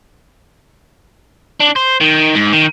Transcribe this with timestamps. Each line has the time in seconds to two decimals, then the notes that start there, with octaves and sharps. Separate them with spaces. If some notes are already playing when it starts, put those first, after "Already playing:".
1.60 D4
1.76 C5
2.01 D#3
2.35 G#2
2.53 D#3